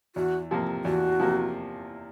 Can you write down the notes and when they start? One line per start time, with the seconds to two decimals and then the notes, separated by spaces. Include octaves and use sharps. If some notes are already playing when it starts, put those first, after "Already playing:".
0.16 E2 F#4
0.51 C3 F3 A#3
0.85 E2 F#4
1.19 C3 F3 A#3